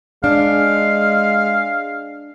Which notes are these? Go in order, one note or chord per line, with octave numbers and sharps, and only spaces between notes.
G#3 D4 F5